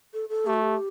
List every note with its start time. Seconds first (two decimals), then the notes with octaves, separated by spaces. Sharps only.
0.14 A4
0.29 A4
0.46 A3 G4
0.54 F#4
0.62 G4